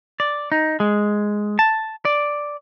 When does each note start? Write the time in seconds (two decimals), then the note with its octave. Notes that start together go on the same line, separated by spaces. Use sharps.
0.20 D5
0.52 D#4
0.80 G#3
1.59 A5
2.05 D5